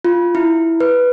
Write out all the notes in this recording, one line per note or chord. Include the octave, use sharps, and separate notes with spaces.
F4
E4
B4